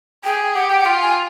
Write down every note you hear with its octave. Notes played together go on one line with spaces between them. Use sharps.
G#4 G5
G4 F#5
G5
F#5
F4 G5
G#5